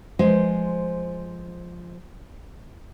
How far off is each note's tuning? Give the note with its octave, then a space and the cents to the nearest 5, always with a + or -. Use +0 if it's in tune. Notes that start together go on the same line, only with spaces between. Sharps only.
F3 +0 G#3 +0 C5 +0